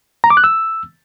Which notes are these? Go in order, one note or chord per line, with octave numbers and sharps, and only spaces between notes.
A#5
D6
F#6
E6